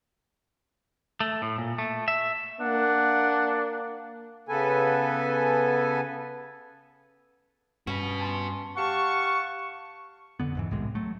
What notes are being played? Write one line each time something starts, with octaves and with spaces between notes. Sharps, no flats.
A3
A2
A#2
A3
E5
A#3 D4 F#5
C#3 B3 A4 B4 G#5
G2 C#4 F#4 B4
G#5 A5 C6
G4 F5 F#5 A5 C#6
F2 D3 B3
E2 G#2 E3
C2 A2 C3 G#3
F#3 A3